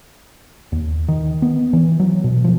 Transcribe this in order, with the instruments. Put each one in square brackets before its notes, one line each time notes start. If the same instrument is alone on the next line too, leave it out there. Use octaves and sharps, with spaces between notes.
[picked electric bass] D#2
D#3
B3
E3
F#3
B2
F3